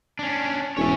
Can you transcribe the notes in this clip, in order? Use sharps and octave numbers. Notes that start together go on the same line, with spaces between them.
C#4 D4
E1 C#4 C#5 E5